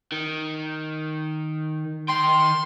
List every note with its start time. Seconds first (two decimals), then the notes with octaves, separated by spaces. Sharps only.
0.12 D#3
2.09 D#3 G5 C6